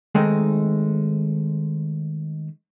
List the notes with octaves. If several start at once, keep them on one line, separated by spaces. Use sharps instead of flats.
D#3 G#3 A3 C4 D#4